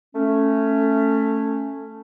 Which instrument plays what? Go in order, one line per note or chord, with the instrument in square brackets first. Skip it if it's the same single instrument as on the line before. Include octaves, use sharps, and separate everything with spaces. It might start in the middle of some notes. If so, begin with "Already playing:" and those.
[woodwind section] A3 C#4